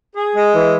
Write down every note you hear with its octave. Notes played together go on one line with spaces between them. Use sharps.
G#4
G#3
E3